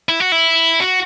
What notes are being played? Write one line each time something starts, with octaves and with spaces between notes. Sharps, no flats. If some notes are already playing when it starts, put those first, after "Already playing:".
E4
F#4
E4
F#4